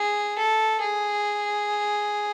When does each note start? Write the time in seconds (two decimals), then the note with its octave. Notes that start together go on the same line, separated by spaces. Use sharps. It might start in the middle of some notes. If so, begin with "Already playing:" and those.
Already playing: G#4
0.38 A4
0.82 G#4